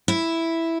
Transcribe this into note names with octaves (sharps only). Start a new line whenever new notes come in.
E4